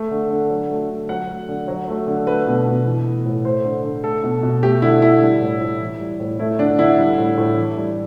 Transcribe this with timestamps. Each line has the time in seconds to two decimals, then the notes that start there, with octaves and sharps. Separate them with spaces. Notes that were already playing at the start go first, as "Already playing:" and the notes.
Already playing: A3
0.11 D3
0.30 D3
0.50 F#3
0.70 A3
0.90 D3
1.09 F#3 F#5
1.29 A3
1.49 D3
1.68 F#3
1.88 A3
2.07 D3
2.27 A3 B4
2.47 B2
2.67 B2
2.86 E3
3.05 A3
3.26 A2
3.45 A3 C5
3.65 D3
3.84 D3
4.04 A3 A4
4.24 B2
4.43 B2
4.63 A3 G4
4.82 D3 E4
5.02 D3 E4
5.21 G3
5.41 A2
5.61 A2
5.80 E3
6.00 G3
6.20 A2
6.39 A3 E4
6.59 D3 D4
6.79 D3 E4
6.98 G3
7.18 A2
7.38 A2
7.57 E3
7.77 G3